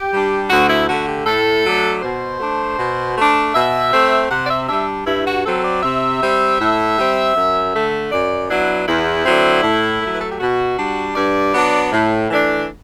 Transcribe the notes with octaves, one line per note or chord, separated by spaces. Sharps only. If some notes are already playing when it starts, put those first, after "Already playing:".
Already playing: G4
G3 D4
D2 F#4
E4
D3 A3 F#4
G4
A2 A4
F#3 A3 D4
B2 C5
A3 D4
B2
A3 D4
B2 E5
A3 C4
C3 F#5
D5
E5
G3 D4 E5
G2 E4
F#4
F#3 C4 A4
D5
C3 E5
G3 C4
A2
G3 C4
F#2
D3 A3
F#2 D5
F#3 B3 D4 E4
E2 E4
D3 F#3 C4
A2
F#3 A3
B4
A4
G4
B2 F#4
G3 D4
G2 D5
F#3 B3 D4
A2
E3 A3 D4